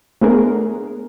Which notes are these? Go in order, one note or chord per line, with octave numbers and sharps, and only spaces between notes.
A3 B3 D4 G#4 A#4